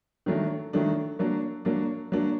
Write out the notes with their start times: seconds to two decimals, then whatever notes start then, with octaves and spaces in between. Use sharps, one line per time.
0.26 D#3 F#3 A3 D4
0.73 D#3 F#3 A3 D4
1.19 F#3 A#3 D4
1.65 F#3 A#3 D4
2.12 F#3 A#3 D4